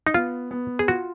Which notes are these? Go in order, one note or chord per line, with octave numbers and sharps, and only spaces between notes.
D#4
B3 F4
B3
G#4
F4 F#4